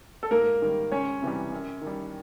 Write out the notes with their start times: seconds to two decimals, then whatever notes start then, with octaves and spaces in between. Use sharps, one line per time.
0.23 A4
0.31 G#2 A#3 A#4
0.62 D#3 G3
0.92 C#2 C#4 C#5
1.22 C3 E3 G3
1.52 F#2
1.81 D#3 G3